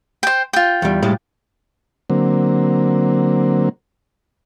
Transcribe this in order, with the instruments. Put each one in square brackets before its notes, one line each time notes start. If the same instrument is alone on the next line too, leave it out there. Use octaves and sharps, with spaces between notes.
[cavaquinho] C5 G5
F4 G5
[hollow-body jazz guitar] E2 G3
A2 G3 G#3
[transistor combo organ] D3 F#3 A#3 C4